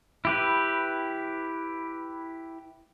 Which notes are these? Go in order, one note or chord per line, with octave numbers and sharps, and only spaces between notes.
E4 G4 B4